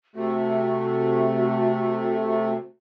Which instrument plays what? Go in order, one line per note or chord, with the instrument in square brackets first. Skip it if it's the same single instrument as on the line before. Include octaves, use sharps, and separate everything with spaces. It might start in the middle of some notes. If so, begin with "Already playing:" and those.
[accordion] C3 A3 [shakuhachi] F#4